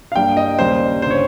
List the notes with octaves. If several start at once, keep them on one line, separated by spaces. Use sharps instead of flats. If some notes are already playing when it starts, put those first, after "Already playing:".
F5
G2 G3 A#3 G5
D#5
D#2 C#3 G3 A#3 C5
G1 C#3 C5 C#5